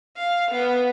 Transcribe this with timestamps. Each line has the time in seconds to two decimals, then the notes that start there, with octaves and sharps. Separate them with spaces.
0.17 F5
0.51 B3